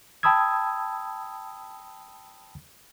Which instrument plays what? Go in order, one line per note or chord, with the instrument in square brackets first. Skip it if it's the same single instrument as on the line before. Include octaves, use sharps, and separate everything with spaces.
[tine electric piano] G5 A5 B5 D#6 E6 G#6